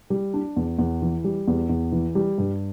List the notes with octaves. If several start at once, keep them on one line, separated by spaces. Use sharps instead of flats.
G3
D4
E2
E2
E3
G3
E2
E2
E3
G3
G2